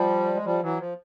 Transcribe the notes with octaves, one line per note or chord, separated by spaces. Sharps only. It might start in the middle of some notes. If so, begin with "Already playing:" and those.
Already playing: F3 G3
G#3
F3 G3
E3 F#3
F3